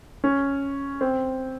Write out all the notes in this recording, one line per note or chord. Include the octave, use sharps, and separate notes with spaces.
C#4
C4